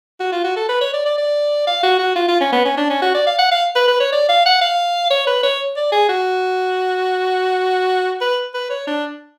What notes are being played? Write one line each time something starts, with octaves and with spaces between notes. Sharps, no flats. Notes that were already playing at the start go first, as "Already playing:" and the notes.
F#4
F4
F#4
A4
B4
C#5
D5
D5
D5
F5
F#4
F#4
F4
F4
C#4
B3
C#4
D4
C#4
F#4
D5
F5
F#5
F5
B4
B4
C#5
D5
F5
F#5
F5
C#5
B4
C#5
D5
G#4
F#4
B4
B4
C#5
D4